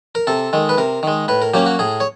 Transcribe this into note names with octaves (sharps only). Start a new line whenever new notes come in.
A#4
C3 A4
D#3 G#3
B4
C3 A#4
D#3 G#3
A2 B4
A#4
F#3 A#3 C#4 G4
F#4
A2 G#4
C#5